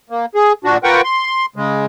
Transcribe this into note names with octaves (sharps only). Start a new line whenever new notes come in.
A#3
G#4
A#2 D4 F#4
F4 A#4 B4 F#5 G5 C#6
C6
C#3 G#3